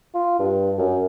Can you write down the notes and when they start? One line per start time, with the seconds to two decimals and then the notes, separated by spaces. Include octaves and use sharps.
0.15 F4
0.39 G2
0.78 F#2